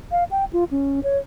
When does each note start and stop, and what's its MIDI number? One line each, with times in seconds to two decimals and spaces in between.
0.12 0.24 77
0.31 0.45 79
0.53 0.64 65
0.71 1.00 61
1.04 1.18 73